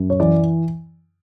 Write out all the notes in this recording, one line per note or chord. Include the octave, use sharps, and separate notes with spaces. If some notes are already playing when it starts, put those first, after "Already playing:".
Already playing: F#2
C#5
E3 D5